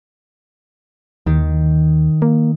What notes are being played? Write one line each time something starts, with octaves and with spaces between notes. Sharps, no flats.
D#2 D#3
A#3